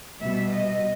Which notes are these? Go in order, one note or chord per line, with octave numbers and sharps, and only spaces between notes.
B2 G3 B3 E5
D#5